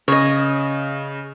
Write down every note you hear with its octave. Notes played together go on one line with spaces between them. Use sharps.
C#3 C#5 D#5